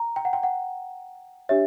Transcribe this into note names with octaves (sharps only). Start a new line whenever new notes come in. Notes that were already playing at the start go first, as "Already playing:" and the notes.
Already playing: A#5
G5
F#5
G5
F#5
D4 G4 C#5 E5